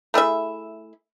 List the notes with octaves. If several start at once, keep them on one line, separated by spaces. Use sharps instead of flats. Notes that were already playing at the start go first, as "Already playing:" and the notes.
A3 E4 G#4 E5